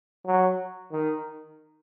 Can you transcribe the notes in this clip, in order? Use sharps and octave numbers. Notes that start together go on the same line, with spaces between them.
F#3
D#3